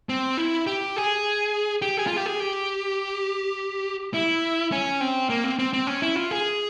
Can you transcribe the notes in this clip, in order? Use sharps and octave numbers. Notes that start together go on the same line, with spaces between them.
C4
E4
G4
G#4
G4
G#4
F4
G4
G#4
G4
E4
C#4
C4
A#3
C4
C4
C4
C#4
E4
F4
G#4